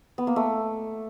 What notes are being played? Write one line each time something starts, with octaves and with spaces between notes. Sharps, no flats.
B3
A#3
A3